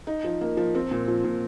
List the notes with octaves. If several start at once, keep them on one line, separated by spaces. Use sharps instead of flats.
D#4
F3
A#3
F3
C4
A#2
F3
A#2